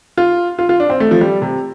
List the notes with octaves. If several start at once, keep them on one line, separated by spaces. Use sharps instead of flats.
F4
F4
F4
D4
C4
A3
F3
G3
C3